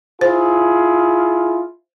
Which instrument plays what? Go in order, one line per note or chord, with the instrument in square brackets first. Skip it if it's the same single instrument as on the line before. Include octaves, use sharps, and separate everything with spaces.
[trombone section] E4 F4 G#4 [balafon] C5